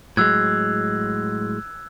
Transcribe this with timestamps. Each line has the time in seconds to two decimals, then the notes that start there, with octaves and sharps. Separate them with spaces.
0.17 A2 F#3 G#3 E6 F#6 G#6